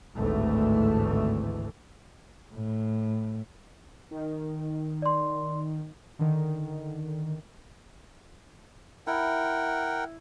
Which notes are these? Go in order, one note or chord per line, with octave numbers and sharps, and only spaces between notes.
G#1 D2 A2 E3 A3
A2
D#3
D5 C6
D3 D#3
E4 A#4 F#5 G5